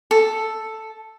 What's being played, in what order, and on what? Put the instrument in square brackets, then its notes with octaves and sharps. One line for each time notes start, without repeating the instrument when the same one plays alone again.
[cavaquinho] A4